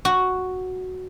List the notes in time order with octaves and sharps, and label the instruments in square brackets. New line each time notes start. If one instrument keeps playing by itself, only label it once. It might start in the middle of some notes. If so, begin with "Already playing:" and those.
[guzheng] F#4